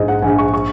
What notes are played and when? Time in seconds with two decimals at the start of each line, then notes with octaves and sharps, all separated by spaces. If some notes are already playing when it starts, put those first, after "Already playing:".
Already playing: A#1 G#2 G#3 D#5
0.08 F#5
0.22 A#1 G#5
0.38 C#6
0.54 C#6